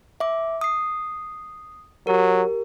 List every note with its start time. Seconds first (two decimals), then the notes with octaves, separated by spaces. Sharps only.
0.20 E5 D6
0.61 D#6 C7
2.07 F#3 G4 A#4